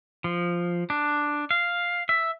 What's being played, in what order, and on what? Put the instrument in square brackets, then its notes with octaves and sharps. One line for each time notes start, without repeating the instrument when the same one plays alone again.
[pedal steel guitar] F3
D4
F5
E5